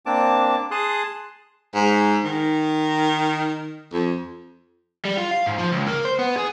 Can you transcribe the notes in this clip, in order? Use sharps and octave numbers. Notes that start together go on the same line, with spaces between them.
A#3 C4 D4 A5 D6
G#4 A5 C6 D#6 F#6
G#2
D#3
F2
G3
F4
F5
G#2
F3
C#2
A#3
C5
B3
G#4